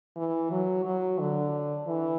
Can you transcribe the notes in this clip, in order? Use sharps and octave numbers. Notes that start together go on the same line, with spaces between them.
E3
F#3
F#3
D3
E3